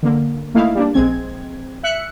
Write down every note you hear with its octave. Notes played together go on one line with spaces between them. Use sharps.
D3 A#3
A3 A#3 D#4 E4 F5
G3 A#3 D4
A#1 G#3 C4 G#6
E5 F#6 C#7